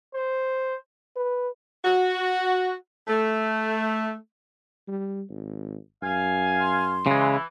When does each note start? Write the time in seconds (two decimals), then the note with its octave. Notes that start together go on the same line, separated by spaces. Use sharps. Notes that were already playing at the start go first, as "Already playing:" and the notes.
0.15 C5
1.16 B4
1.85 F#4
3.08 A3
4.88 G3
5.30 G#1
6.02 F#2 F5 G#5
6.60 C6
7.07 C#3 E3 G#3